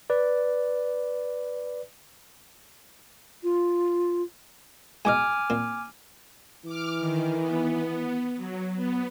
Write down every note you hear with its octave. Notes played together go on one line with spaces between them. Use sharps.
B4 D5
F4
G#2 B2 D#5 G#5 D6 F6
A#2 C4
E3 D6 F6
D#3
B3
F#3
B3